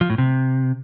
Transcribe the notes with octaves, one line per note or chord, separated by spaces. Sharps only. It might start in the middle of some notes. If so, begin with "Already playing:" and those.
F3
A2
C3